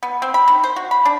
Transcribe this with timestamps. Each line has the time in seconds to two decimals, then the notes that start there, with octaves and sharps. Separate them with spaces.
0.03 B3
0.22 C4
0.34 B5
0.48 D#3
0.63 C5
0.76 F#4
0.91 B5
1.05 D4